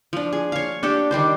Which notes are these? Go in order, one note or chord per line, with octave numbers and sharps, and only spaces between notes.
F3 D4
G#4
C#5 F5
D4 G4 A4
D#3 G3 D4 C5